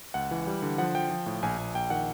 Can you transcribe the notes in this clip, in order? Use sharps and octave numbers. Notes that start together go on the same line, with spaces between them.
C#2 F#5
E3
G3
D3
F3 F#5
F3 G5
F3
A2
A#1 G#5
A#1
A#1 G5
D#3 F#5